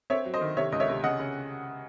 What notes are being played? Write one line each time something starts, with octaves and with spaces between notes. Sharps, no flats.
C4 C#5 E5
F#3
C5 D#5
D#3
C3 C#5 E5
C#2 D#5
C#5 E5
C3
C#3 D#5 F#5
C#3